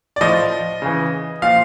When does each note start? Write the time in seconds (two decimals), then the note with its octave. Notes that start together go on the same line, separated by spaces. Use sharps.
0.16 D5
0.21 A2 F3 D#5
0.82 C#3 E3
1.42 A#2 F3 F5